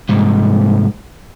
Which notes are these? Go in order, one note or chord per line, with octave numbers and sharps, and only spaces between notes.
C2 G#2